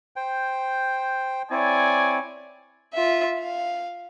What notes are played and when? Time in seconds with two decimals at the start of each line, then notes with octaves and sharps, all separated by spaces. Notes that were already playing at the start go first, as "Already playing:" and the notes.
0.16 C5 G5
1.51 C4 E4 C#5 D5 G#5
2.94 F4 E5
3.39 F5